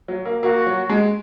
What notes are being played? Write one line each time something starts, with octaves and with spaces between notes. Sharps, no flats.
F#3
A#3
A#3 F#4
F#3
G#3